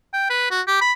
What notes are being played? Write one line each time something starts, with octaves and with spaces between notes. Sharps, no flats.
G5
B4
F#4
G4
B5